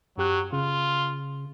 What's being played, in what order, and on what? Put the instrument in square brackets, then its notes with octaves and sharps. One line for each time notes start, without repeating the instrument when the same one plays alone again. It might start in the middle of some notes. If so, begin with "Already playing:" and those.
[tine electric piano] F#2 G4 F#6 [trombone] F#3
[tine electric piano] C#3 [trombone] F4